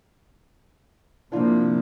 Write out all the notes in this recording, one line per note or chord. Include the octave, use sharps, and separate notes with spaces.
C3 F3 A#3 D4 E4 F4